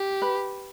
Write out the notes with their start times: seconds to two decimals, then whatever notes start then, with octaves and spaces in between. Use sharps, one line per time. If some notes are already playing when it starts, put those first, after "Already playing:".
Already playing: G4
0.22 B4